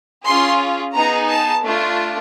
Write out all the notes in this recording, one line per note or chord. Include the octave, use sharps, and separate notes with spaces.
C#4 F4 G#4 C6
B3 D#4 G#4 A#5
A5
A3 D4 F4